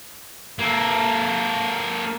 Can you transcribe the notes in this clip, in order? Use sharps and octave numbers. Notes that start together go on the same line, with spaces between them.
A#3 A4